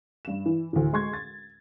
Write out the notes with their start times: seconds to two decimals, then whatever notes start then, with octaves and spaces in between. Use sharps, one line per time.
0.25 G2 E7
0.46 E3
0.73 D2 A2
0.93 G#3 C6 C#6 G#6
1.13 A6